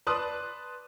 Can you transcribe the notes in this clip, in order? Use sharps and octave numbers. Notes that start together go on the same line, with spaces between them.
B4 D5 A5 C6 D#6 F#6